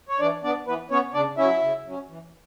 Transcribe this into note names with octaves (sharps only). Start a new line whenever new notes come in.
C#5
E3 D4 D5
B3 D4 D5
E3 B3 B4
B3 C#4 C#5
C#3 D4 D5
F#3 C#4 E4 E5
C#3
F#3 C#4
E3